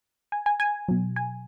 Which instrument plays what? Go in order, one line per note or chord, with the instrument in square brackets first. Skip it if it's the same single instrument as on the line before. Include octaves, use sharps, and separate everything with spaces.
[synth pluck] G#5
G#5
G#5
B2 F#3
G#5